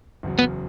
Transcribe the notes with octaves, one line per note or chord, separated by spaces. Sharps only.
F#1 E2 C#3 F#3
B3